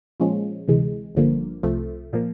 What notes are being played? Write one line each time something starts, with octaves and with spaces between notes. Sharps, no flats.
A#2 F3 G#3 C#4
D2 C3 E3 G#3
G1 G2 D3 F3 A#3
C2 C3 F3 A3
A#2 F3 A#3